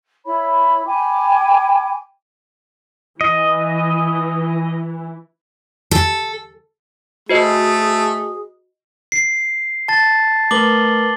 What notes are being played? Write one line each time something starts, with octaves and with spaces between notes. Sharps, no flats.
E4 C#5 B5
G5 G#5 B5 D6
E3 D#5
A4
A3 F#4 G#4 C5 D#5
C7
A5 A6
A3 A#4 B4 D6 F#7 G7